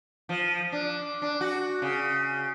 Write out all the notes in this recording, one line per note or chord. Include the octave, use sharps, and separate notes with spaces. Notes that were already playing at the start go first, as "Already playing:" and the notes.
F3
D4
D4
F#4
C#3